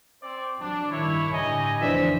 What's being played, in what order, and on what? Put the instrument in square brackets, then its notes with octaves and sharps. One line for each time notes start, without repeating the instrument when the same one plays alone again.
[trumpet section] C4 C5 D5
[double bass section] F#3 [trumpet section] D4
[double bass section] G2 D#3 [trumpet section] E4 [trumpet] C#5
[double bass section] A2 D3 [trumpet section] G3 G#5 A#5 [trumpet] D#5
[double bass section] F1 D3 F3 [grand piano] E3 D4 C5 [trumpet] E5